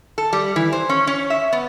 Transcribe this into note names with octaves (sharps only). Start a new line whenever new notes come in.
A4
G3
E3
C5
C#4
C#4
E5
B3